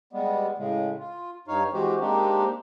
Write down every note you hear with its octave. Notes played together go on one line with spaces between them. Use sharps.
G3 G#3 B3
A2 C#3 G#3
F4
G2 D#4 C#5 F5
E3 G#3 C4 F#4 G4 C5
G#3 A#3 C4 D4 D#4 G4